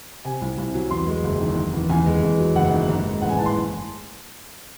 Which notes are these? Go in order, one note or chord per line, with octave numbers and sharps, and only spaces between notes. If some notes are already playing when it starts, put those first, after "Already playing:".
C3 G#5
C2
C2
F#3
E2 C6
G#3
F#1
D#3
D#3
E2
E2 G#5
G#3
E2
F#3
F#1 F#5
D#3
G#2
G#3
A1 F#5
G#5
E3 A5
C6